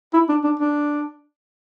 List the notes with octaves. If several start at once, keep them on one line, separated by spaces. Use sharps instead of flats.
E4
D4
D4
D4